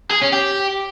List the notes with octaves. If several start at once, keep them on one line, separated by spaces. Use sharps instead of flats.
G#4
C#4
G4